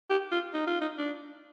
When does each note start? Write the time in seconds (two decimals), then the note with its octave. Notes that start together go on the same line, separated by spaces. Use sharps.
0.10 G4
0.32 F4
0.54 D#4
0.67 F4
0.81 D#4
0.98 D4